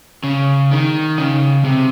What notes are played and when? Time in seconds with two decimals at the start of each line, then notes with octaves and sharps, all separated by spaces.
0.24 C#3
0.71 D#3
1.18 C#3
1.65 C3